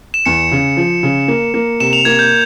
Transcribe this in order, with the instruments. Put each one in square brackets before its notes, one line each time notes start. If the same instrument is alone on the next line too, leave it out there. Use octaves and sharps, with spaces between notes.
[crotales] E7
[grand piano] E2 [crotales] C#7
[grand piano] C#3
F3
C#3
A#3
A#3
[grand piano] C3 [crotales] E7
[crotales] F7
[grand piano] A#3 [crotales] G#6
[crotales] G6